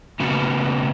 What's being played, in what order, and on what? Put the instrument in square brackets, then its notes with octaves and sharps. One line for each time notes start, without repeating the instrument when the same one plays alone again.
[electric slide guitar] A2 C#3 B3 C#4 F#4